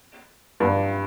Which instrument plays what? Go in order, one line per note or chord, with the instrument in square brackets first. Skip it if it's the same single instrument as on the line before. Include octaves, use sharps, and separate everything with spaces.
[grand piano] G2